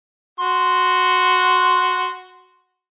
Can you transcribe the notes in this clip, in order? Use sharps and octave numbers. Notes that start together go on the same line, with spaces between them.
F#4 C6